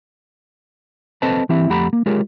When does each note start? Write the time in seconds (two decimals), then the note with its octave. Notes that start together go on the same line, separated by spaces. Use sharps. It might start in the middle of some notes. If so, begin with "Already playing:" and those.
1.22 C4 A4 B4 C5 D#5 A5
1.49 E3 C4 E4 G4 E5
1.70 F2 A3 G4 F#5 A#5 B5
1.93 A#3
2.06 G#3 F4 G4 G#4 A#4 C#5